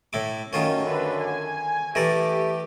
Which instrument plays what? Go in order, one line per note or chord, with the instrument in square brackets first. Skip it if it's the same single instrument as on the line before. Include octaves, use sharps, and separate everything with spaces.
[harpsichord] A2 E4 D6
[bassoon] F#2 [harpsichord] D#3 F4 C#5 [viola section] A3 C#4
[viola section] D3 B4
G#5
[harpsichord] E3 A#4 D5 [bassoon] A3 [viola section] G4